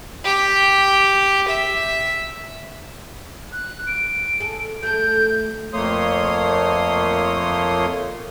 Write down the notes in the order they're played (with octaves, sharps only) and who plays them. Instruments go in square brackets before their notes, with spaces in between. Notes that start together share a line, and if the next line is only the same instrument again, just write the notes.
[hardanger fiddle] G4
E5
[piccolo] F#6
D7
[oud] G#4 A4
[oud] A3 A4 [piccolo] G6
[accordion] F2 A3 A#3 C#5 C6 D#6